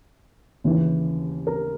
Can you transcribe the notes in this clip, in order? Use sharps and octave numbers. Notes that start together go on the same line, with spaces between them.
D#2 C#3 E3
A#4